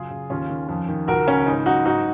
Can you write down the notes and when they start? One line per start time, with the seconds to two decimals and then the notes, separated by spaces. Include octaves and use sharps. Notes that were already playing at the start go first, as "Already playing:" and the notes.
Already playing: F#2 C#3 F4 G#4
0.11 C#3
0.30 D#2 C#4 F4
0.49 D#3
0.69 F2
0.88 D#3
1.08 C#2 F#4 A#4
1.27 C#3 C#4
1.46 G#2 D#4
1.66 F#3 D#4 F#4
1.85 G#2 D#4 F#4